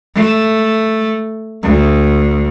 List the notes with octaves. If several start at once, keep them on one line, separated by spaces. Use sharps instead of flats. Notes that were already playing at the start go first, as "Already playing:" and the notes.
A3
D2